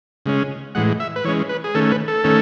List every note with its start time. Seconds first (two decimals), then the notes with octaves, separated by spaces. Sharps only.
0.26 C#3 G#3 C#4
0.75 A2 E3 G#3 F#5
1.00 E5
1.16 B4
1.24 E3 G#3 C#4 C#5
1.49 B4
1.64 G#4
1.75 D#3 A3 C#4 A4
1.91 B4
2.08 A4
2.24 D#3 A3 C#4